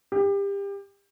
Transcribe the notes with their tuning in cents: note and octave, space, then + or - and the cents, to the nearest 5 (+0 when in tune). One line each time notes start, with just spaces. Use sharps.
G4 +30